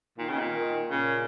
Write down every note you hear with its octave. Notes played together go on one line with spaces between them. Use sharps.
A#2 D#3
C#3
A#2
D#3
A#2 C#3